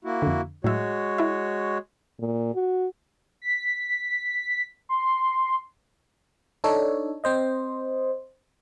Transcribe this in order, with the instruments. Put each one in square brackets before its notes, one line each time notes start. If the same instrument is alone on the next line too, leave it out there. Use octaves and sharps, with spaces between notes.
[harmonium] A#3 E4 F#4
[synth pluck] F2 D3
[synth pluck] A2 F#3 E5 [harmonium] G#3 F#4 C#5
[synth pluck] E4 E5
[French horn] A#2
F#4
[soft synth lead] B6
C6
[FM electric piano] D4 D#4 A4 C#5
C4 C5 D#5